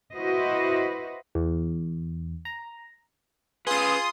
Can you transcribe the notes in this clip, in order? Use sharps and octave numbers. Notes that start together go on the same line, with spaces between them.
E4 F#4 B4 C5 D#5
E2
A#5
C#4 F4 G#4 B4 C6 D#6